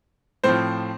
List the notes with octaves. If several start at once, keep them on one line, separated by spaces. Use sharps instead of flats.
A2 F3 C4 C5